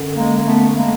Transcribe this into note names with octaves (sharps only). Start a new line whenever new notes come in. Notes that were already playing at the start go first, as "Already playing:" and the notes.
Already playing: F#2 D3
G#3 A#3
A3 B3
G#3 A#3